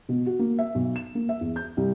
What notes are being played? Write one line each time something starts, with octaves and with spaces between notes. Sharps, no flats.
B2
F#4
A#3
E5
B1
E7
A#3
E5
E2
G6
C2